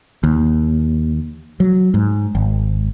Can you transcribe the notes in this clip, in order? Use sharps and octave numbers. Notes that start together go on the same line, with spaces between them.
D#2
F#3
G#2
G#1